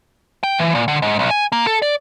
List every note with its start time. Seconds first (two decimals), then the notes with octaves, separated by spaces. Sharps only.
0.43 G5
0.59 E3
0.75 A#2
0.88 D3
1.02 G#2
1.19 B1
1.30 G#5
1.52 A#3
1.67 A4
1.82 D5